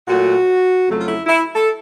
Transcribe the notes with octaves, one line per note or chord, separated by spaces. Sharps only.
A#2 F#3 A3 F#4
F2 C#3 F#3 A3
F4
E4
E4
A4